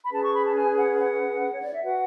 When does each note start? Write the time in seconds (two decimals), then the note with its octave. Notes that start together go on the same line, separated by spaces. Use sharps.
0.02 B5
0.11 C#4 G#4 B4 A5
0.22 C#6
0.32 B5
0.44 A5
0.55 G#5
0.75 F#5
0.98 F#5
1.51 C#5
1.63 D5
1.73 E5
1.83 F#4 B4 F#5